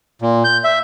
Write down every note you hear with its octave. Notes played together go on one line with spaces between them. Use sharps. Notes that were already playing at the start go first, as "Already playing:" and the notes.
A#2
G6
E5